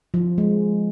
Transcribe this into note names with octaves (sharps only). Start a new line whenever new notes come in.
F3
G#3